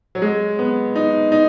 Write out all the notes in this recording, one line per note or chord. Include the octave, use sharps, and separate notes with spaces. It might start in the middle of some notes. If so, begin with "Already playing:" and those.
F#3
G#3
B3
D#4
D#4